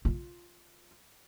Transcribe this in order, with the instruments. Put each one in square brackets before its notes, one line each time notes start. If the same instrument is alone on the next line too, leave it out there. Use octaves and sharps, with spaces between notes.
[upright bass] F4